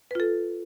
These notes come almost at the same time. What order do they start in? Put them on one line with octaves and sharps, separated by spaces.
B4 F4 A4